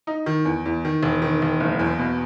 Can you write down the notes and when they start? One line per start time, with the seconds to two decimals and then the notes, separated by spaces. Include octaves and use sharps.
0.07 D#4
0.26 D#3
0.45 E2
0.65 E2
0.85 D#3
1.03 E1
1.22 D#3
1.42 E1
1.60 F#1
1.79 E2
1.98 B2